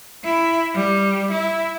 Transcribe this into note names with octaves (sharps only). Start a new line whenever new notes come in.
E4
G3
E4